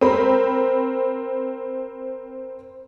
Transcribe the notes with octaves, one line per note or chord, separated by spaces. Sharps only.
C4 A#4 B5